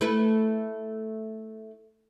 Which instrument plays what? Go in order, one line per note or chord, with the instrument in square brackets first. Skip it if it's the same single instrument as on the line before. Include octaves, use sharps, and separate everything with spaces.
[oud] A3 E4 B4